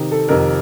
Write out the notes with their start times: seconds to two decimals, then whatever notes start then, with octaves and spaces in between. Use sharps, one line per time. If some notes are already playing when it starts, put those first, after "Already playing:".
Already playing: C3 D#3
0.12 A4
0.28 F2 C3 D#3 A#4